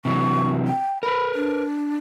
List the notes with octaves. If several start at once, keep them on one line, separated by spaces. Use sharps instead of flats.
C3 E3 F#3 C#6
G5
A#4 B4 B5
D4